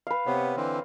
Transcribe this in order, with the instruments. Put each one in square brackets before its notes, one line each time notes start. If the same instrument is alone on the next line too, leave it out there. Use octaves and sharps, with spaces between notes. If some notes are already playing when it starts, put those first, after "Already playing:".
[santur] B4 F5
[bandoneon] C3 B3 [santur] C#5 D#6
[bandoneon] D3 E3 C4